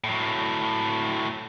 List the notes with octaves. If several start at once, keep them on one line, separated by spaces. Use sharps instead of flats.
A2 F#3